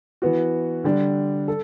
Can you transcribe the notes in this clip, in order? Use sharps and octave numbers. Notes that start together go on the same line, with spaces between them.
E3 B3 F#4
D3 G3 D4
A4